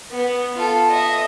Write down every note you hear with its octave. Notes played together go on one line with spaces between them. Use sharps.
B3
F4 A4
D#5 E5